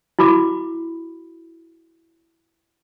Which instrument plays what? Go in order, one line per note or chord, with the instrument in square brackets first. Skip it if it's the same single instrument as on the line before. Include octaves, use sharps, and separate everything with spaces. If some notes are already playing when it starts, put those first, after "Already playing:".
[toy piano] E4 F#4 B5 D6